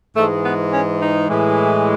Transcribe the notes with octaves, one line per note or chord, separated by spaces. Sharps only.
G#2 E3 G#3 A3
B3
C#4
D#4
A2 E3 G#3